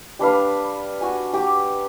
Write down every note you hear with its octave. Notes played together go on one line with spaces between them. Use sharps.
G3 D4 B4 F5
F#4 G#5
G4 D6